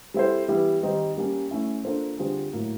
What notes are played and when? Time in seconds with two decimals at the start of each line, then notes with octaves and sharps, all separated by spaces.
0.14 G3 C4 E4 A4 C5
0.48 E3 G3 B3 E4 G4
0.83 D#3 G3 C4 D#4
1.17 G3 A#3 C#4
1.51 A3 C#4 E4
1.85 A#3 D4 F4 A4 C5
2.18 D3 G3 C4 F4 G#4
2.53 A2 F#3 A#3